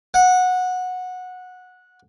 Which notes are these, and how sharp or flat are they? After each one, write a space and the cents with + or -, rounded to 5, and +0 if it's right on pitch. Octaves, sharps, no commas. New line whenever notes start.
F#5 -15